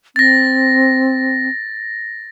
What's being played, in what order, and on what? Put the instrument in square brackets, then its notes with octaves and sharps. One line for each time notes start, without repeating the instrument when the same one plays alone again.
[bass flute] C4 [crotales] A6 A#6